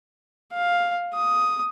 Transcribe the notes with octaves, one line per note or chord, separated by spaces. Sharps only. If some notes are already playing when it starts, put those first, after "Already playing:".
F5
D#6